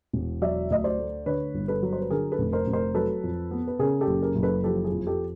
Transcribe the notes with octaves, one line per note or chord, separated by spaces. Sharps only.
E1
F#3 D5 E5
D2 D#5
C5 D5
A3
D3 B4 C#5
G1
A4 B4
F#3
C5
B4
D3 G#4 A#4
A4 B4
F1
A#4 C5
F1
A#4 C5
F#3 A4 B4
F2
B3
B4
C#3 G#4 A#4
G4 A4
F#1
G#4 A#4
F#1
A4 B4
F3 G4 A4
G#4
F2
G4 A4